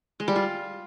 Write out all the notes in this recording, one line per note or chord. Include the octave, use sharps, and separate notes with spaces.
G#3
G3
F4